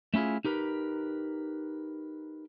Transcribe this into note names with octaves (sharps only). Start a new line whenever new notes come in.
A3 C#4 E4 F4 G#4
D#4 G4 A#4 B4